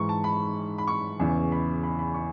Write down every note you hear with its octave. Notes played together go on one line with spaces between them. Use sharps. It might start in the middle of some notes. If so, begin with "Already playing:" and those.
Already playing: G#2 E3 C#6
A5
B5
B5
C#6
E2 C#3 E3
B5
B5
B5
C#6